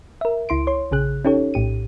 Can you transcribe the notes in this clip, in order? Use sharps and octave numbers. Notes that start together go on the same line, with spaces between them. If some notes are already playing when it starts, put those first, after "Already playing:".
A#4 E5
C#2 E4 C6 D7
C#5 C6
A#1 C#3 G#4 F#6
C#4 D#4 G4 A4 C#5
A#1 A2 G4 D#7